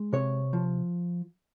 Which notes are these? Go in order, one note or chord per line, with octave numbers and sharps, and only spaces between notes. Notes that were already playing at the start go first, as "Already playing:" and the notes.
Already playing: G#3
C3 C#5
F3